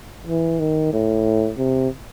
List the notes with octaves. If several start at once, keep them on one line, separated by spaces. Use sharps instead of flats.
E3
D#3
A2
C3